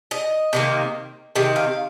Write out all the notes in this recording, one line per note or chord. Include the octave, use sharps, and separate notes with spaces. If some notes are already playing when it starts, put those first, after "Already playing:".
D#5
C3 D#3 A#3
C3 D#3
F5